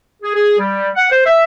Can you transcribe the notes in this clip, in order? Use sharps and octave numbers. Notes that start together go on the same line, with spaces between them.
G#4
G#4
G3
F#5
C5
E5